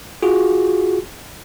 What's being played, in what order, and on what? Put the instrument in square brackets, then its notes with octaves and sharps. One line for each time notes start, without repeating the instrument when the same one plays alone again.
[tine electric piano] F4 F#4 G#4